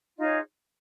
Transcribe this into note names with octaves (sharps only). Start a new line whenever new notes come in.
D#4 F4 G#4 C#5 D#5